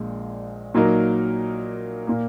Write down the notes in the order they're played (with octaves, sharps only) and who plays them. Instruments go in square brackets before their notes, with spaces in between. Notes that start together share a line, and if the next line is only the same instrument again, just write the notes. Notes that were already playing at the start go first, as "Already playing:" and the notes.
Already playing: [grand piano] A#1 A#2 G#3
A#2 F#3 A#3 D#4 A#4
A#2 A#3